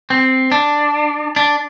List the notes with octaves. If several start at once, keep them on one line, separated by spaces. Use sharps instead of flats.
C4
D4
D4